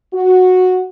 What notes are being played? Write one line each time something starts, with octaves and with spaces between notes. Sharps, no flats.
F#4